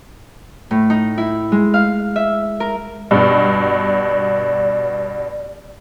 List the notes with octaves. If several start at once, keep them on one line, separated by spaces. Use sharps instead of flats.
A2
D#4
E4
G#3
F5
E5
A#4
G2 B2 D5